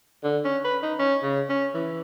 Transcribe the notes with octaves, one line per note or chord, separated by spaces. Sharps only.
D3
C#4
B4
D#4
C#4
C#3
C#4
E3